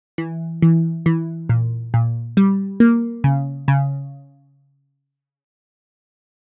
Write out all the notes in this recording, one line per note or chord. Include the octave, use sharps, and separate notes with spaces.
E3
E3
E3
A#2
A#2
G3
A#3
C#3
C#3